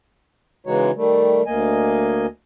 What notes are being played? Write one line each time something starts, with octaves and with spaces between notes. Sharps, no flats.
C#3 E3 G#3 D#4 F#4 C#5
D#3 G3 A3
D2 A#3 D#5 G#5